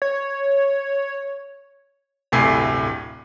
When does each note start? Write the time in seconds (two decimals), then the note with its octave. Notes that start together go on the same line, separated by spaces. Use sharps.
0.02 C#5
2.32 D1 G1 A2 C3 G#5 C7